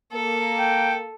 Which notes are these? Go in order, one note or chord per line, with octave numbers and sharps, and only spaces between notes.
A#3 A4
G5